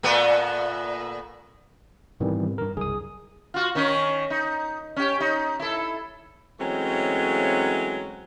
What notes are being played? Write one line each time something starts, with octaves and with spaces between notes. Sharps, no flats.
A#2 A3 B3
G#2 B2 D#3 E3 G3 C4
G2 A#4
F#1 C2 G#4 D#6
F4 F#4
D#3 C#4 D#4
D#4
C#4 G4
D#4
E4 A4
E3 F#3 G#3 A3 C4 C#4